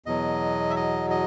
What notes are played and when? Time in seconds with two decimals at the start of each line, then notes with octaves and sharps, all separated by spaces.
0.06 E2 B2 F#3 D#5
0.70 E5
0.76 D#5
1.10 D#5